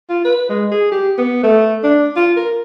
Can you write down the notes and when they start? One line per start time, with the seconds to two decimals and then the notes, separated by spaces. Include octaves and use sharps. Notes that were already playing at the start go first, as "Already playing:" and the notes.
0.10 F4
0.25 B4
0.49 G#3
0.71 G#4
0.91 G4
1.18 B3
1.43 A3
1.83 D4
2.16 F4
2.36 A#4